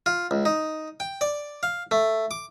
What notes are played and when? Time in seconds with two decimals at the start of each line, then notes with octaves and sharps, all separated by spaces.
0.06 F4
0.31 C#2
0.45 D#4
1.00 G5
1.21 D5
1.63 F5
1.91 A3
2.31 D6